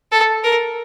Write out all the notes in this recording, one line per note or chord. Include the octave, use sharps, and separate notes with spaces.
A4
A#4